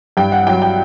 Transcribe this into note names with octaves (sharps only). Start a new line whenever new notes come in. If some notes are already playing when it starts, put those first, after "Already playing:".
G2 G5
F#5
F#3 G5
G5